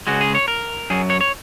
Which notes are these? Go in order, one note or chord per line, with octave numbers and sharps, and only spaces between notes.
C#2 C#3 G#3 F#4
G#4
C#5
A#4
F#2 F#3 G#4
C#5
C#5